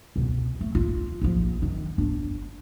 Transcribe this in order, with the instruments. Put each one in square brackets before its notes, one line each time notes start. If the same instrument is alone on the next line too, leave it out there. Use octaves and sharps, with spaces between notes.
[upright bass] C#2 B2
A3
F4
A#1 F3
F#2 D#3
G1 D4